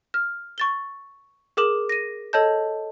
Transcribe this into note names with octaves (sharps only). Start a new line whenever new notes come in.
F6
C#6 A6 G7
G#4 A#4 D6 E7 F#7
A#6 D#7
A4 C#5 D#5 A5 G6